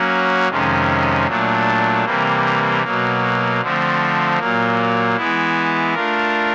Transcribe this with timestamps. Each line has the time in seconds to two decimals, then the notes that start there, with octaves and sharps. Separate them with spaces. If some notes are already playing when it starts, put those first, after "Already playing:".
Already playing: F#3 A#3 C#4 F#4
0.49 F2 C3 D#3 G#3 C#4
1.26 A#2 F#3 A3 D4
2.05 C3 E3 G3 A#3
2.83 B2 F#3 A#3
3.61 D3 F3 A3 C4
4.39 A#2 F#3 A#3
5.16 E3 G#3 B3 E4
5.94 A3 D4 F4 A#4